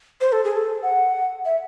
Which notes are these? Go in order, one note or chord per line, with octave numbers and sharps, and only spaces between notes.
C5
A4
G#4
A4
F#5
E5